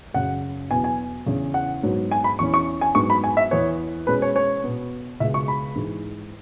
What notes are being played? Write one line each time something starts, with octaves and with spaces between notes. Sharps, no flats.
F#2 C#3 F#3 F#5
E2 B2 F#3 B3 G#5
G#5
E2 C#3 E3 C#4
F#5
G#2 F#3 B3
G#5
B5
E2 E3 C#4 C#6
C#6
G#5
G#2 F#3 B3 C#6
B5
G#5
E5
E2 E3 B3 C#5
B2 G#3 C#4 B4
C#5
C#5
B2 B3
C#2 B2 G#3 E5
C#6
B5
G#2 E3 G#3